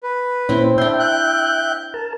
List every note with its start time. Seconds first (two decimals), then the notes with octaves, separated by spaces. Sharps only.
0.03 B4
0.49 A#2 C4 C#4 E4 C5
0.78 D4 E5 G5 C6
0.99 F#6 G6
1.94 A#4 A5